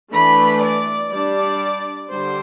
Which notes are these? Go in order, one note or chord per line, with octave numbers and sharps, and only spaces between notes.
E3 A3 D4 B5
D5
G3 D4 D5
D3 G3 D4 C5